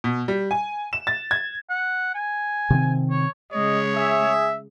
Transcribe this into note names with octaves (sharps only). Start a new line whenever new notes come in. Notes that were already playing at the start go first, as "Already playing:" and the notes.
B2
G3
G#5
E7
A6
G#6
F#5
G#5
C3 D#3 C4
C#5
C#3 G#3 C#5 D#5
G#4 E5